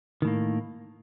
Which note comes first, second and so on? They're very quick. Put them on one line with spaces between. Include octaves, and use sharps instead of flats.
D#3 A2 A#3